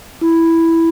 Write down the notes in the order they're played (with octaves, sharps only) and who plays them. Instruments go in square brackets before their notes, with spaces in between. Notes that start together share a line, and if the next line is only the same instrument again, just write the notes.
[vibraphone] E4